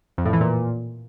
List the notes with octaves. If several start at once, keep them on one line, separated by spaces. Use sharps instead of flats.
F2
A2
E3
A#2